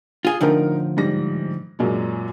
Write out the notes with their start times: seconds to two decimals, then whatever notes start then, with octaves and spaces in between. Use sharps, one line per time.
0.25 F4 G#4
0.41 A2 D3 F3 D#4 A#4
0.97 G#2 G3 A#6
1.79 F#2 A#2 G#3